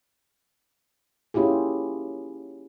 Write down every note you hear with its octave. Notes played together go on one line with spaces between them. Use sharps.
A#3 C#4 E4 F4 G4 G#4